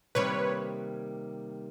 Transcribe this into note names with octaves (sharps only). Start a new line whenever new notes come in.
C3 D#3 G3 A#3 B4 C#5